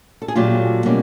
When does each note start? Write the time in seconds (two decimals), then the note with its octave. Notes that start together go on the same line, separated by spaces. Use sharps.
0.22 A4
0.28 G#4
0.35 A#2 F#3 A3 F4 G4
0.85 B2 G3 A#3 C#4